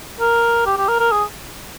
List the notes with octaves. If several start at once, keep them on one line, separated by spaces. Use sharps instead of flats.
A#4
G4
G4
A#4
A#4
G#4